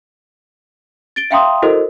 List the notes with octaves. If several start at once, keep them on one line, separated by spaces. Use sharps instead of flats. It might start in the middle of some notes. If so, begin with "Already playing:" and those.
A6 D7 G7
E5 F5 G5 A#5 C6 D#6
E4 F#4 A4 A#4 C5 D#5